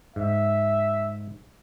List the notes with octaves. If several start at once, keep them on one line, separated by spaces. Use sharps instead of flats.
G#2 E5